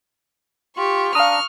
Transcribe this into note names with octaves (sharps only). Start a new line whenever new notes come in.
F4 G4 C#6
D4 F5 A#5 C#6 D#6 F6